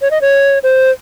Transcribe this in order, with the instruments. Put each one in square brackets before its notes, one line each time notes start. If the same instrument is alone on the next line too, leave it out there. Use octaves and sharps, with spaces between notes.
[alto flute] C#5
D#5
C#5
C5